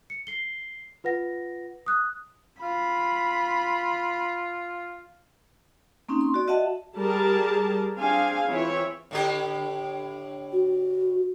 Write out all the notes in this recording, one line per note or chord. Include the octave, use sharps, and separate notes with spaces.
C#7
C7 G7
F4 B4 F#5 A#6
D#6 F#6
F4 B5
A#3 C4 C#4 D#4
C6
F#4 D5
F#4 D#5 E5 F#5 A5
G3 G#4 A#4 A5
C4 D4 G#4 F5 G#5
E3 C4 E4 F4 C#5 E5
A2 D3 G4
F#4